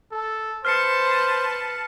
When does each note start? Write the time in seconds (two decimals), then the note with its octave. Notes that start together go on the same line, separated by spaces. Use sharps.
0.12 A4
0.65 B4 C5 A5 F6 C7 C#7